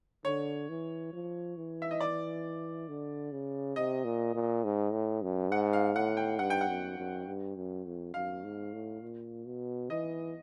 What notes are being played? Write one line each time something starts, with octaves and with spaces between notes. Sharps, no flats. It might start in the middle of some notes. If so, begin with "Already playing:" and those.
D3 C#5
E3
F3
E3
E5
D#5
D5
D3
C#3
C3 D#5
A#2
A#2
G#2
A2
F#2
G#2 F#5
F5
A2 F#5
G5
G2 F#5
G5
F#5
F#2
F#2
G2
F#2
F2
F#2 F5
G#2
A2
A#2
B2
E3 D#5